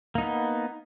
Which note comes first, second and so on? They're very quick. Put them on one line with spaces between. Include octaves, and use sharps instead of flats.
A#3 D#4 B3